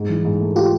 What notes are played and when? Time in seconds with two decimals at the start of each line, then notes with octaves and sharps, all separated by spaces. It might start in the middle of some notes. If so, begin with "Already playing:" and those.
Already playing: G#2
0.09 E3
0.25 G#2
0.40 A3
0.56 F4 G4